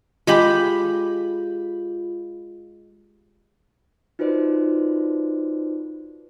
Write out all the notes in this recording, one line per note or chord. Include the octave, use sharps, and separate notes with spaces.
G#3 F4 G4 B5
D#4 F4 F#4 B4 C5 D5